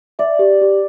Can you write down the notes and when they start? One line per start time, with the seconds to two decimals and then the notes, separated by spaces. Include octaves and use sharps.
0.19 D5 E5
0.39 G4
0.61 G4